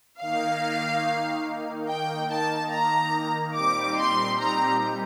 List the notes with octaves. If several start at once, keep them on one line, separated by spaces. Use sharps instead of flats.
D#3 A#3 D#4 F5
G5
A5
A#5
A#2 G3 C4 D#4 G4 D6
C6
A#5